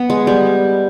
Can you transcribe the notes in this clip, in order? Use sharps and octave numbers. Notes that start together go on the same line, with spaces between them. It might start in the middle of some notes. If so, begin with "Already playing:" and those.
Already playing: B3
G#3
G3